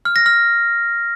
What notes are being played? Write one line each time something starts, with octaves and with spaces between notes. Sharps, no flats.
F6
A#6
F6